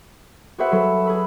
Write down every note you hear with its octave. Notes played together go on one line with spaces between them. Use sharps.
F#4 G#4 B4 C5 E5 F#5
F#3 A4 B4 B6
G#4 B4 B5 E6